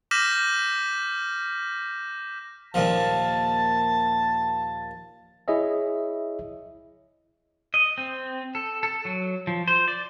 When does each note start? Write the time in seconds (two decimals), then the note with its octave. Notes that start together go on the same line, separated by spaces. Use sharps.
0.11 D6 F6 G6 A#6 B6 E7
2.74 D#2 A#2 F3 A5
5.48 E4 G#4 C#5 D#5 E5
7.74 D#5
7.98 C4
8.55 A4
8.83 A4
9.05 F#3
9.47 F3
9.68 C5
9.88 D5